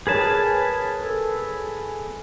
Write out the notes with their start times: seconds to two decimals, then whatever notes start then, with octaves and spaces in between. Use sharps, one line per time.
0.07 G#4 A#4 B4 C#5 A5
1.04 A4